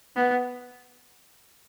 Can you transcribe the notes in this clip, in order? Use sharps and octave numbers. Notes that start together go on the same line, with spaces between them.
B3